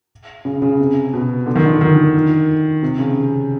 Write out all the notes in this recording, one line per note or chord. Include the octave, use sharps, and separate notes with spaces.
C#3
C#3
C3
B2
D3
D#3
D3
D#3
C3
C#3